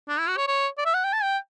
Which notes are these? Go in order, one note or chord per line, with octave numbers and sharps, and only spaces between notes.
D4
E4
F#4
C#5
C#5
D5
E5
F#5
G5
A5
G5